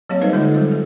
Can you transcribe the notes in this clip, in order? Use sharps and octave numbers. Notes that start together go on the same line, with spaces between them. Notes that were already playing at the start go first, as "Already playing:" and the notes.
F#3 A#3 C4 G4 C#5 F5
G3 D#4 A4 B4 C5 D#5
D3 G#3 F4 A4 D#5 E5
F#3 G3 C5
G4